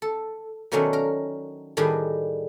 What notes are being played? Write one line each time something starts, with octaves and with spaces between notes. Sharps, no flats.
A4
B2 D#3 F#3 A3 C#4 D4
A#4
A2 D#3 G3 D4 G#4